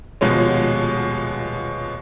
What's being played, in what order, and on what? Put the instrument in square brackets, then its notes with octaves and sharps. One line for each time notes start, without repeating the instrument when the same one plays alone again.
[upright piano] D#1 B2 F3 G#3 C#4